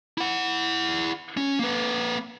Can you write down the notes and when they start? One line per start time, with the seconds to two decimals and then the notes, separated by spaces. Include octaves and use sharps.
0.18 E4 F#5
1.37 C#4
1.59 A#3 B4